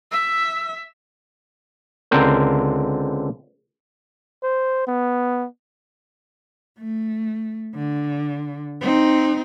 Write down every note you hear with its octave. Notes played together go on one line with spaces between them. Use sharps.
E5 E6
C#2 D3 C4 A#4 C5
C5
B3
A3
D3
C4 D#4